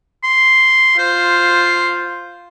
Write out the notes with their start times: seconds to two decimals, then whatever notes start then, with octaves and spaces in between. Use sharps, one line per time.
0.24 C6
0.99 F4 C5